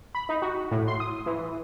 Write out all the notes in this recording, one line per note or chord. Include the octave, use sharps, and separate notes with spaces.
B5
D#4
F#4
A2
C6
D#6
E3